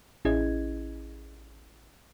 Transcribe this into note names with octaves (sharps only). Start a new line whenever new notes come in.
A1 C#4 E4 G#4 D#5 G#6